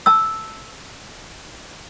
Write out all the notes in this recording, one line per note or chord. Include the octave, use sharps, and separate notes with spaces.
A5 E6